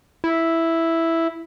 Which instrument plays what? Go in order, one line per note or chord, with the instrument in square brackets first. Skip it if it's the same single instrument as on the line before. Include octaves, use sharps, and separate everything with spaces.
[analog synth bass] E4